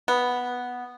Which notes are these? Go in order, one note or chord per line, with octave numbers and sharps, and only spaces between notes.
B3